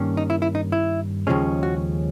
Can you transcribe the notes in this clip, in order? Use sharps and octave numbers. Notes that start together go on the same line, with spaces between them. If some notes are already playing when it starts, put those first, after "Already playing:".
Already playing: G2 D#3 A#3 C#4
D#4
E4
E4
D#4
E4
D#2 C#3 F3 G#3 C#4
F#4